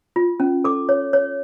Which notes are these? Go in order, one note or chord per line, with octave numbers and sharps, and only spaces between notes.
F4
C#4
A4 D6
C#5
C#5